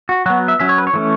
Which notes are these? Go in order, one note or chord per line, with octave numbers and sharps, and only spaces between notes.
F#4
F#3 B3 F#4
E5
F#3 C#4 E5
C#5
B4
C#5
E3 A3 C#4